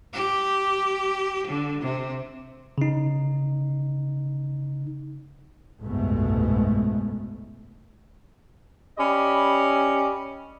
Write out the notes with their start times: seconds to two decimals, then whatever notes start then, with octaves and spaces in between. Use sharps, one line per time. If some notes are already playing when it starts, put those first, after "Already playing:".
0.14 G4
1.47 D3
1.81 C3
2.78 C#3 D#4
5.81 F#1 C2 G#2 B2 G#3 A3
8.98 C#4 G4 D5 D#5 B5